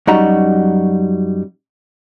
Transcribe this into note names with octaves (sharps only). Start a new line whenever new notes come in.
F#2 F#3 G3 D#4 F#4 A#5